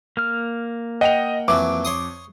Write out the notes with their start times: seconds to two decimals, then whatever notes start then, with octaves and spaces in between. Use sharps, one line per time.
0.17 A#3 F6
1.01 D#5 F#5 G5 F7
1.48 F2 E3 F#3 D6
1.85 C#5 C6 D#6